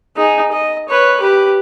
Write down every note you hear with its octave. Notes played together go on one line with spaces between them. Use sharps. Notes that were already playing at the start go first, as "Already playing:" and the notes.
D#4 G#4
D#5
B4 C#5
G4 B4